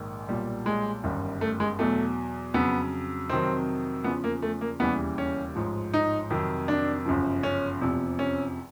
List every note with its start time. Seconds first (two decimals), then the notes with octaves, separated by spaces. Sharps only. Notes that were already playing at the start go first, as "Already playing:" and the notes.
Already playing: A#1 G#2 D#3
0.29 B1 A#2 G3
0.66 G#3
1.04 G1 F#2 D#3 G3
1.41 A3
1.60 G#3
1.79 E2 B2 F#3 A3
2.54 F2 C#3 F#3 B3
3.30 F2 C3 D#3 F#3 C4
4.04 E2 C#3 F3 B3
4.24 A#3
4.42 A3
4.61 A#3
4.80 E1 D#2 C#3 E3 G3 B3
5.18 C#4
5.56 A1 G#2 F3
5.94 D#4
6.30 F2 C3 D#3 F#3
6.68 D4
7.05 G1 F#2 C#3 F3
7.43 C#4
7.81 F1 E2 C3 F3
8.19 C#4